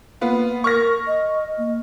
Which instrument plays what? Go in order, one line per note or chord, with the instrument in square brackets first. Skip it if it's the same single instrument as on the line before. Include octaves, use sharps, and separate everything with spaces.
[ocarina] A#3 [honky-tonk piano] B3 F4
[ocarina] A#4 [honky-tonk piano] C#6 F6 A#6
[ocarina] D#5
A#3